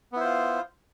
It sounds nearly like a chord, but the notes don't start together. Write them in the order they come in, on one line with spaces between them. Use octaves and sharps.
B3 E4 C5 F4